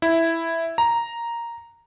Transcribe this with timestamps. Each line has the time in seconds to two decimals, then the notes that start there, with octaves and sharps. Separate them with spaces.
0.02 E4
0.78 A#5